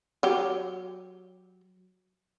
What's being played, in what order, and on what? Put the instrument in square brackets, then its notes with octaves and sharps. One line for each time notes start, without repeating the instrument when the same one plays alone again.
[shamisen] F#3 G4